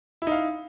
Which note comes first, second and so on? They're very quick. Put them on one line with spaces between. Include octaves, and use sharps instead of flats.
E4 D#4 F5